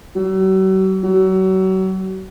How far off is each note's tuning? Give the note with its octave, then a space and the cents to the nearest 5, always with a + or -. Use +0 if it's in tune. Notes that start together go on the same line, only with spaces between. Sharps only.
F#3 +40
F#3 +35